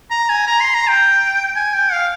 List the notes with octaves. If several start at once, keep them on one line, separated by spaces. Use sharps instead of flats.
A#5
G#5
A#5
C6
A#5
G5
G#5
G5
F5